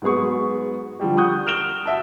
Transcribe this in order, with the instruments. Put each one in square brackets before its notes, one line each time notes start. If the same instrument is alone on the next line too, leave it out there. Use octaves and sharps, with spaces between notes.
[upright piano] G#2 F#3 B3 G#4 C#6
D3 F3 G3 G4
F#5 C#6 D#6 F#6 G6
F6 F#6 D7 E7 F7 G7
F#4 E5 A5